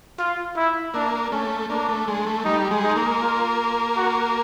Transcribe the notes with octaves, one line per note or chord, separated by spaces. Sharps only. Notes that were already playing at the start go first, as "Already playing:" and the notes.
F4
E4
A#3 D4
A3 C#4
A#3 D4
A3
G#3
A3
G3 D#4
G#3
D#4
A#3
F4
F#4